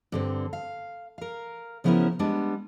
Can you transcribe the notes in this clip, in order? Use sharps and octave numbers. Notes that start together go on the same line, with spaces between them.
G2 D3 C4
F5
A#4 F5
C#3 F3 B3 C#4 E4 A#4
G3 G#3 B3 D4